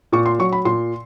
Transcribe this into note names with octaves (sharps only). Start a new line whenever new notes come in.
A#2 C#6
C6
F#3 C#6
B5
A#2 C6